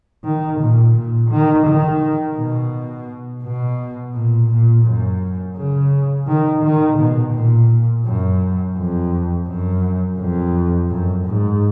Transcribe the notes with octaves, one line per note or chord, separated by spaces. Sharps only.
D#3
A#2
A#2
D#3
D#3
B2
B2
A#2
A#2
F#2
C#3
D#3
D#3
B2
A#2
F#2
F2
F#2
F2
F#2
G#2